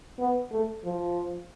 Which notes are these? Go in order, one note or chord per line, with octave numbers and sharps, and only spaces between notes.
B3
A3
F3